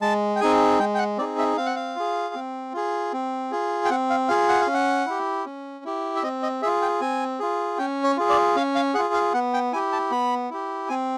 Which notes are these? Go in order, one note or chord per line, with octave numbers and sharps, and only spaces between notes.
G#3 A5
G5
C4 D#4 G#4 G#5
G#3 G5
G5
F#5
C4 D#4 G#4 D5
E5
C4 F5
F#5
F5
F4 G#4
C4
F4 G#4
C4
F4 G#4
G5
C4 F#5
F5
F4 G#4 F5
F#5
F5
C#4
F#5
E4 G4
C#4
E4 G4
E5
C4 D#5
D#5
F4 G#4 E5
G5
C4 G#5
F4 G#4
C#4 G5
C#5
F4 G#4
D5
C#4 F5
F5
F4 G#4 F#5
F5
B3 F#5
G5
E4 G4 G#5
A5
B3 B5
E4 G4
C4 G#5